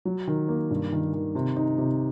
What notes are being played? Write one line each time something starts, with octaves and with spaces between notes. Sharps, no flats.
F#3
D#3
A#3
G2
D#3
D#3
C3
D#4
C3